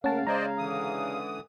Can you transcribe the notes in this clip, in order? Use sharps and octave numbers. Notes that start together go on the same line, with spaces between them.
C#3 A3 A#3 C#4 A#4 F5 F#5 A5
G#3 C#4 C5 D5 D#5 A#5 G#6
D3 E3 D#6